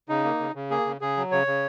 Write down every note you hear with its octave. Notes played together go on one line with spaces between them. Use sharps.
C#3 D#4
A#3
C#3
C#3
A#3 G#4
C#3
C#3 G#4
F#3
C#3 C#5
C#3